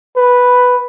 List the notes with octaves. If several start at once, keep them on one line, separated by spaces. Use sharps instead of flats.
B4